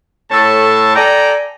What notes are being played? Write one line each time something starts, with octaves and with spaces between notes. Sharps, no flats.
A2 A4 C#5 A5
A4 D5 G5 G#5 A#5